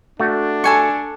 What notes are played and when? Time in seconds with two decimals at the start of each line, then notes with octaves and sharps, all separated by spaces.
0.20 A3 D4 F#4
0.64 A4 G#5 C#6